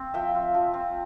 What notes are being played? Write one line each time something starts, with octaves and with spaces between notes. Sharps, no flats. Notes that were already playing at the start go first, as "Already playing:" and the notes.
Already playing: C4
F3 E5 G5
F4
F3
C4